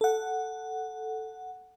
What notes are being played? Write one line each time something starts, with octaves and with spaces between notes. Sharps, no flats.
A4 F#5